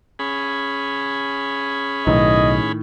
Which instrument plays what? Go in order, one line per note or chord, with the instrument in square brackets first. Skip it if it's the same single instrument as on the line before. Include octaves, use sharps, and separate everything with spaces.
[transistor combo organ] C#4 G#4 B5
[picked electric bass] B1 [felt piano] A2 D#3 [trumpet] D#5